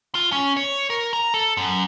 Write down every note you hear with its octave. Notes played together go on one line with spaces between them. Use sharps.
F4
C#4
C#5
A#4
A#5
A4
F#2